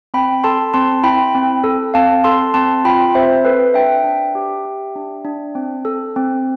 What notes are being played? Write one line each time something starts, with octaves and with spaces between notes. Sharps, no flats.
C4 G5 B5
A4 A5 C6
C4 A5 C6
E4 G5 B5
C4
A4
C4 F5 A5
A4 A5 C6
C4 A5 C6
F4 G5 B5
C4 C5 E5
A4 B4
D4 E5 G5
D4
G4
G4
D4
D4
C4
A4
C4